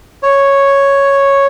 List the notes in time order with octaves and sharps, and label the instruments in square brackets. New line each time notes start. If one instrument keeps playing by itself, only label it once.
[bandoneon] C#5